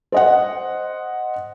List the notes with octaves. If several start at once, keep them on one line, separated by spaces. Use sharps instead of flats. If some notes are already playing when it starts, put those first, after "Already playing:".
C5 D#5 F#5